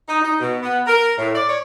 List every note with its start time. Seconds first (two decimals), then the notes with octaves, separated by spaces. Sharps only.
0.08 D#4
0.22 D#4
0.40 B2
0.62 B3
0.87 A#4
1.18 A2
1.33 D5
1.48 C#5